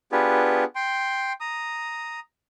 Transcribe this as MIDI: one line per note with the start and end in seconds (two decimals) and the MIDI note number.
0.12 0.64 59
0.12 0.64 62
0.12 0.64 65
0.12 0.64 67
0.12 0.64 68
0.12 0.64 71
0.75 1.33 79
0.75 1.33 84
1.41 2.20 82
1.41 2.20 87